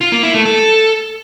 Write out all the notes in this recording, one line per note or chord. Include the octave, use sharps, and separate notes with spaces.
F4
A#3
E4
A3
A4